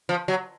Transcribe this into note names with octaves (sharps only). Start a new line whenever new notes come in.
F3
F#3